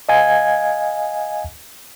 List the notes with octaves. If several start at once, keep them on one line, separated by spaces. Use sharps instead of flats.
D#5 F5 G#5 G#6